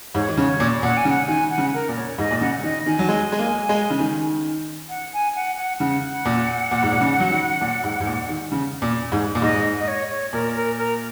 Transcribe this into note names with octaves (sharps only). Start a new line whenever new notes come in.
G#2 C#5
D#3
C#3 C#5
A#2
A#2 F#5
G#5
C#3
F#5
D#3 G#5
F#5
C#3
A#4
A#2
C#5
G#2 D#5
A#2
C#3 F#5
D#3 D#5
D#3 G#5
F#3
G#3
G#3
A#3
G#3
C#3
D#3
F#5
G#5
F#5
F#5
C#3 F#5
A#2
A#2
G#2
A#2
C#3
F#3
D#3
A#2
G#2
G#2
A#2
D#3
C#3
A#2
G#2
A#2
G#2 D#5
D#5
C#5
C#5
A#2 A#4
A#4
A#4